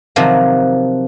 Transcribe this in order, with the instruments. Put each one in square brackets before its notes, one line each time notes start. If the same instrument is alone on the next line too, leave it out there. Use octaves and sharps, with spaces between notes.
[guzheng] C3 D#3 F3 F#3